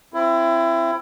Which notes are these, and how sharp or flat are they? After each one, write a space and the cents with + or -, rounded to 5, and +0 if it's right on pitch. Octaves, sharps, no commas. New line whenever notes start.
C4 +0 E4 +25